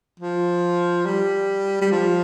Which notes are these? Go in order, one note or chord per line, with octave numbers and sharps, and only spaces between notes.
F3
G3
G3
F3